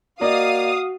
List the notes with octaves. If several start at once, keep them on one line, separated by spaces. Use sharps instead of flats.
A#3 F#4 D5 D#5 F5 D#6